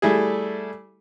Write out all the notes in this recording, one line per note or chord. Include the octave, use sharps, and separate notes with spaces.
G3 A3 E4 G#4